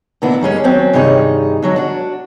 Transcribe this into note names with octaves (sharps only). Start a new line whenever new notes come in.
A#2 D#3 E3 B3 D4 E4
F#2 G3 G#3 C#4
D#2 F#3 C4 C#4
G2 C3 D#3 D#4 G#4 C#5
D3 F#3 G#3
D4 F#4